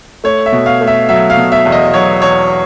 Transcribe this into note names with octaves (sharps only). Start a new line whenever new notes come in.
A3 C#5
E5
B2
F5
A3
E5
F#3 E5
F5
B2
E5
E2
D#5
F#3 C#5
E2 C#5